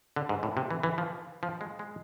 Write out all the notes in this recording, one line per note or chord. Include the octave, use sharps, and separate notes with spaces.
D3
G#2
A2
C3
E3
E3
F3
F3
G#3
G#3